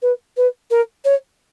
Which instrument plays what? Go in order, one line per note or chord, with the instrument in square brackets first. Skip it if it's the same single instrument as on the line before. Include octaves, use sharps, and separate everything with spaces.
[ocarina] B4
B4
A#4
C#5